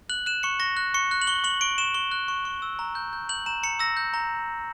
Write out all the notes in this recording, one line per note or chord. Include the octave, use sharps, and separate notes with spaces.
F#6 F#7
F#6 E7
C#6 C#7
C#6 A#6
F#6
C#6 C#7
F#6
F#7
C#6 G7
C#6 F#7
C#6 D7
C#6 E7
C#6 G7
F#6
C#6
C#6
E6
A#5
G6
G6
G6 F#7
A#5 E7
A#5 C#7
E6 A#6
G6
A#5